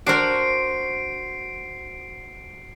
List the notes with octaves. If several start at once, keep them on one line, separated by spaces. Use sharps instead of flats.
D4 F#4 A#4 C5 C7 D7